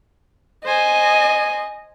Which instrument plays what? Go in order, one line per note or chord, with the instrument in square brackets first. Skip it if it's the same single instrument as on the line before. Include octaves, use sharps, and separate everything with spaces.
[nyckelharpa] C5 G#5 [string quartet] D#5